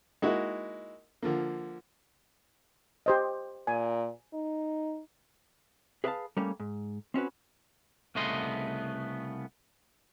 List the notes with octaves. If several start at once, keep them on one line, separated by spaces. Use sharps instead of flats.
G#3 A#3 D#4 E4 F#4
D3 F3 A#3
G4 C5 D#5
A#2 G#5
D#4
G#4 B4 D5 E5 F5 A5
G3 A3 A#3 C#4
G#2
C4 C#4 F#4 B4
C2 C#3 A3 B3 D#5 C6